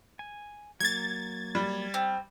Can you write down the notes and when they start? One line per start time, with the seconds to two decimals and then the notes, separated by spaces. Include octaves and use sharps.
0.19 G#5
0.80 F#3 A#3 G#6 A6
1.55 G3
1.94 C4